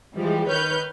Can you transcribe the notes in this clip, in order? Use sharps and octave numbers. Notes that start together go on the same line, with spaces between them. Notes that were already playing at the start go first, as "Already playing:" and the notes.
E3 F3 G3 G#3
D#3 B4 C#5 F6 G6